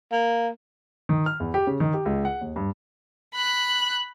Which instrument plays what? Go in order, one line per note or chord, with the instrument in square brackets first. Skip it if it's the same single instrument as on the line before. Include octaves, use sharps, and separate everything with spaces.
[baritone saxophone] A#3
[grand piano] D#3
F6
E2
G4
C#3
D#3
G4
C#2
F#5
D#2
G2
[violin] B5 F#6